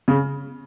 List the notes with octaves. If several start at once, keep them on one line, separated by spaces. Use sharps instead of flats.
C#3